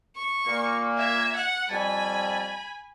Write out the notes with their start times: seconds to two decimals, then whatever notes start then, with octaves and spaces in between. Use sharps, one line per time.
0.16 C#6
0.47 A#2 A#3
0.97 E5 G#6
1.36 F#5
1.70 F2 G3 G#5 A5 B5